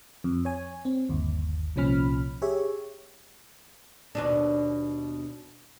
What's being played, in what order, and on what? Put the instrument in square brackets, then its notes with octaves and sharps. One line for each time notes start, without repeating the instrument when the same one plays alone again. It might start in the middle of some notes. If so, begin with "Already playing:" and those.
[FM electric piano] F2
C#5 G#5
C4
G1 D#2
C2 A#2 F3 C#4 B5 F6
G4 G#4 C#5 E5
[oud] D#2 B2 D4